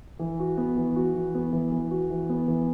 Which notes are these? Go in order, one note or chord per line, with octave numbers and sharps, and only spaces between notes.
E3
F#4
B3
E3
F#4
E3
B3
E3
E3
F#4
E3
B3
E3